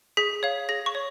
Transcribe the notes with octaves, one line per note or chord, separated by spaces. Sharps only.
G#4 B6
C#5 F5
G#4 A#6
C#6
C#5